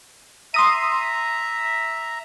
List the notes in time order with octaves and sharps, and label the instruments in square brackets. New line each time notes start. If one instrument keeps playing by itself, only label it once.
[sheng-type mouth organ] E5 A#5 [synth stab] C6 D#6 D#7